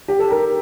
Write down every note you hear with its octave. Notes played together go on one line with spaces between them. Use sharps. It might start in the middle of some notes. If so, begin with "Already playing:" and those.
G4
A4
A#4